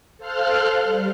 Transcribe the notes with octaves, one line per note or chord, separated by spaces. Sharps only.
A4 C5 F5 C6 F6 F#6
G3